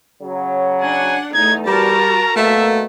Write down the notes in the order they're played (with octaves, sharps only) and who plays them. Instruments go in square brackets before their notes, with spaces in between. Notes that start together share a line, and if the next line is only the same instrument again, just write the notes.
[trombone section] C#3 F#3
[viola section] D4 F#5 [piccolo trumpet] G#5
[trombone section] E2 [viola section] A3 D#4 [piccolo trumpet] G#6
[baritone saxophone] G3 [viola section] F#4 A#4 A5 [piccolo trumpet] A#5
[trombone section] B2 A#3 [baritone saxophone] A3 [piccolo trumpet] E5